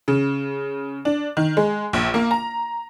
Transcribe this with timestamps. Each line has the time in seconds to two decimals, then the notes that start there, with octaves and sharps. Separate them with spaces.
0.08 C#3
1.05 D4
1.37 D#3
1.57 G#3
1.93 A#1
2.14 A#3
2.31 A#5